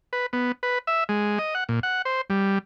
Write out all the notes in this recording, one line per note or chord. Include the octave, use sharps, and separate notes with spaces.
B4
B3
B4
E5
G#3
D#5
F#5
A#2
F#5
C5
G3